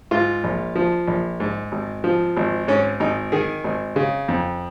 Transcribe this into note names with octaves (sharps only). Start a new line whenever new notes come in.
G#2 F4
A#1
F3
A#1
G#2
G#1
F3
G#1
G#2 C#4
G#1 D#4
D#3 G#4
G#1
C#3
F2